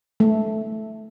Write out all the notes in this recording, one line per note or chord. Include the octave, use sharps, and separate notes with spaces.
A3